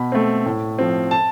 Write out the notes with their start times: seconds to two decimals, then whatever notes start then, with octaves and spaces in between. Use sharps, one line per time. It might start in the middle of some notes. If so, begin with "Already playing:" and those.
Already playing: B2 B5
0.12 A3 C4
0.46 A2
0.79 F3 C4
1.11 A5